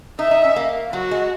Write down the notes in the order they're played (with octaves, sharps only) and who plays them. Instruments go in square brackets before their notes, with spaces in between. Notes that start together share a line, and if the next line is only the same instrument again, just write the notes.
[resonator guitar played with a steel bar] D#4 [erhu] E5
[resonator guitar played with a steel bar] D#4
C#4
A#3
[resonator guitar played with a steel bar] F#3 [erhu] F#4
[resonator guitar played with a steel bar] G#3